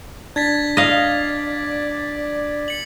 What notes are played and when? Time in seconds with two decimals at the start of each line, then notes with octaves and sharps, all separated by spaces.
0.36 D4 G#6 A6 B6
0.77 D5 D#5 F5
2.68 C#7 F#7